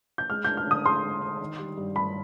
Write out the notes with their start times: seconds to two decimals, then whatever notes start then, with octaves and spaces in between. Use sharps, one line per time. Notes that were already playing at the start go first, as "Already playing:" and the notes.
0.18 G6
0.30 G#3 F6
0.44 D4 G6
0.57 F6
0.66 D3 D#6
0.85 G#4 C6
1.03 G#3
1.22 D4
1.41 D#3
1.59 G3
1.77 G2
1.96 G2 B5